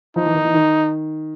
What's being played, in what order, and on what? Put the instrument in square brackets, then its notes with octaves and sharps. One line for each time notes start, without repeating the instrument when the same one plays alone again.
[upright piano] F3 [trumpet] D#4
[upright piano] E3
D#3
E3
D#3